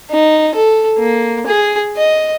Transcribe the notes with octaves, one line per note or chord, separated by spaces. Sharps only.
D#4
A4
A#3
G#4
D#5